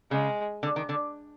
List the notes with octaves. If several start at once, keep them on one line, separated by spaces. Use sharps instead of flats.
C#3 G#3
D3
D#3
D3